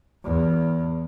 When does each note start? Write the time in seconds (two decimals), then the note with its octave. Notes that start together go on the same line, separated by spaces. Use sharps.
0.24 E2